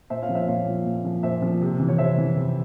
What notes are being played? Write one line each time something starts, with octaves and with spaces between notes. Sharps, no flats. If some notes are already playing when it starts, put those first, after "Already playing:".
A#2 C5 E5
C#5 F5
F3
C5 E5
A#2 C#5 F5
F3
A#2
F3
A#2 C5 E5
F3
C3
E3
C#5
C3 C5 E5
E3
C3